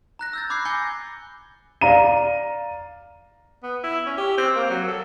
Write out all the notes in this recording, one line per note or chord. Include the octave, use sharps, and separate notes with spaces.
A#5 F#6 A#6
E6 G6 A6
B5 D6 F#6 G#6 C7
G#5 D6 G6 A#6 C#7 G7
D5 F5 A#5 D#7
B3
E4
C#4
G4
C4
A#3
F#3
A4